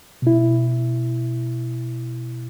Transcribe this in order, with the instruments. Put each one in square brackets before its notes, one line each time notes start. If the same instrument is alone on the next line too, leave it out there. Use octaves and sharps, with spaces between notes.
[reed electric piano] B2 E4